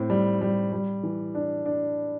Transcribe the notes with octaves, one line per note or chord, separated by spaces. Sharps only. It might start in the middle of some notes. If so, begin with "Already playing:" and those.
Already playing: A2 C4
G3
G3
G3
E3
D4
D4